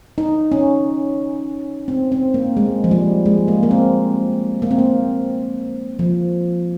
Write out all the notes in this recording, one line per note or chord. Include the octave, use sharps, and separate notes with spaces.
D#4
C#4
C4
C4
A#3
G#3
F3
G3
G#3
A#3
A#3
C4
A#3
C4
A#3
F3